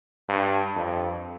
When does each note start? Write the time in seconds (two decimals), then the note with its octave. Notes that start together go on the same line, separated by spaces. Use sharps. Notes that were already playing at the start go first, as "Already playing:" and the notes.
0.29 G2
0.76 F2